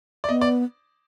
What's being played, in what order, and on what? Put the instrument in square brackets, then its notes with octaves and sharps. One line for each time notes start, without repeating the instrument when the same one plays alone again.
[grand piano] D5
[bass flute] B3 [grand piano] D#5
[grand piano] D5